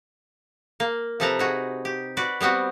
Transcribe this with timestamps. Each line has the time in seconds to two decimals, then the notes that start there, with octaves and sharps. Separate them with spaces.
0.80 A#3
1.20 C3 F3 A4 B4 A5 A#5
1.39 D#4 F#4 G#4
1.85 G4
2.17 F#4 B4 D5
2.41 G3 B3 C4 F#4